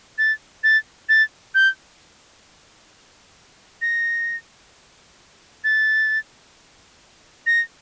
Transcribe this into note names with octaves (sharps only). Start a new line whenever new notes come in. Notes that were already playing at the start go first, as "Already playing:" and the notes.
A6
A6
A6
G6
A#6
A6
A#6